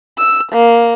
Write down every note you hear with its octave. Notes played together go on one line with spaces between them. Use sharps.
E6
A#3